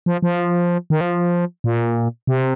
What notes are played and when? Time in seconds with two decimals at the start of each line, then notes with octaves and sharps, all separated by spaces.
0.06 F3
0.22 F3
0.90 D#3
1.01 F3
1.64 A#2
2.27 C3